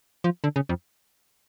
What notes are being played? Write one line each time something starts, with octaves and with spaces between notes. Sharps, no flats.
F3
D3
C#3
F2